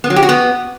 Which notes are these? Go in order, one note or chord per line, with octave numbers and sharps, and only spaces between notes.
B3
F#3
G4
F#4
B3